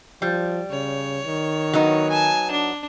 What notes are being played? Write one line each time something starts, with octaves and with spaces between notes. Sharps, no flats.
F3 G3
C#3 C#5
D#3
F#3 B3 D#4
G#5 A5
D4